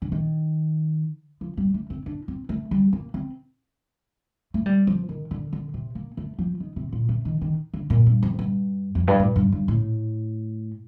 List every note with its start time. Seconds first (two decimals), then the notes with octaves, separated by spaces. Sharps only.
0.02 D3
0.12 D#3
1.41 F3
1.57 G3
1.74 A3
1.90 C4
2.06 D4
2.28 C4
2.49 A3
2.71 G3
2.93 A#3
3.14 C4
4.54 A3
4.66 G3
4.87 F3
5.09 D#3
5.31 D3
5.53 D3
5.74 C3
5.95 A#3
6.17 A3
6.39 F3
6.60 D#3
6.76 C3
6.93 A#2
7.09 C3
7.25 D#3
7.41 D#3
7.74 D3
7.90 A#2
8.06 G2
8.23 F2
8.39 G2
8.95 F2
9.08 G2
9.19 A2
9.36 G2
9.52 G2
9.68 A2